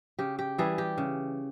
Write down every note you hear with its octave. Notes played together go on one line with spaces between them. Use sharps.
C#3 G4
G4
E3 G3 G#4
G4
C#3